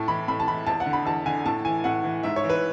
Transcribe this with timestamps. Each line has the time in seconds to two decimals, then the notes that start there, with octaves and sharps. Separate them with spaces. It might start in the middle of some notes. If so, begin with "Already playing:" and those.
Already playing: A2 A5
0.08 E3 B5
0.28 A2 B5
0.40 A5
0.48 E3 B5
0.67 E2 A5
0.80 F#5
0.86 D3
0.93 B5
1.05 E2 A5
1.26 D3 G#5
1.46 A2 A5
1.65 E3 G#5
1.84 A2 F#5
2.04 E3
2.23 G#2 E5
2.36 C#5
2.44 E3
2.50 B4